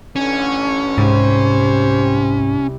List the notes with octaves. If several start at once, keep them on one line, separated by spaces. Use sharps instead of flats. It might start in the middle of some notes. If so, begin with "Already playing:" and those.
A1 D3 C#4
C2 G#2 G4 C5